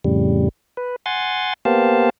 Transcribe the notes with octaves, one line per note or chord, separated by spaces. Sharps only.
F2 A2 C#3 G3
B4
F#5 G#5 C6 A6
A#3 B3 G4 C5 F5 A5